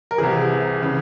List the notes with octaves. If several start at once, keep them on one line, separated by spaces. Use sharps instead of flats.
A#4
C2 C3 E3 G#4
C#3 E3